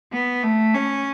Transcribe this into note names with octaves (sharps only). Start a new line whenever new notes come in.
B3
A3
C#4